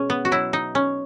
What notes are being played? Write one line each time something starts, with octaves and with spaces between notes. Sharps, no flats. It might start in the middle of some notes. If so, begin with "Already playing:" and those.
Already playing: B2 G#3 C#4
B3
F#4
B2 F#3 E4
D#4
C#4